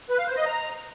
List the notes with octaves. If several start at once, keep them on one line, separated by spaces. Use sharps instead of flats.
B4
F5
C5
D#5
A#5